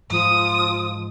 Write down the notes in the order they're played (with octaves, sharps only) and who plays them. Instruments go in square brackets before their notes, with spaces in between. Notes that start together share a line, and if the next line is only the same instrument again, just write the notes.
[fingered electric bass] G#2 [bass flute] F3 [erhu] D#6